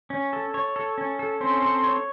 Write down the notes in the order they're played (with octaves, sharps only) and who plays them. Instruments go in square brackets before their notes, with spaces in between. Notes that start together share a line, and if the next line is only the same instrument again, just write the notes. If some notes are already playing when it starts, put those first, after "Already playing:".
[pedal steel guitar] C#4
A4
C#5
A4
C#4
A4
[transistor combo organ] C4 [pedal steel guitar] C#4
[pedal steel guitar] A4
C#5